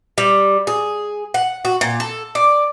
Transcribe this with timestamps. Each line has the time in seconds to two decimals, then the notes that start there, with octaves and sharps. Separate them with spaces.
0.18 G3
0.67 G#4
1.34 F#5
1.65 F#4
1.81 A#2
2.00 A4
2.35 D5